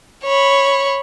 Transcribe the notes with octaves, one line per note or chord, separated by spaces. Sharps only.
C#5 B5